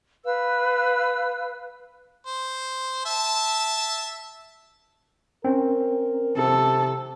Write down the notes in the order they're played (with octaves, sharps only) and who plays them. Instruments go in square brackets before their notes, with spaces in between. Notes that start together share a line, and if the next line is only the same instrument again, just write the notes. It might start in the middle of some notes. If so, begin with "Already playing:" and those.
[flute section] B4 F5 E6
[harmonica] C5
E5 A5
[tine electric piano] C4 C#4 [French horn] A#4
[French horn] C3 [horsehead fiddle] A4